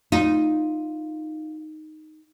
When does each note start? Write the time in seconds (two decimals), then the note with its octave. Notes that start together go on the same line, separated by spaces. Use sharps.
0.12 D#4 F4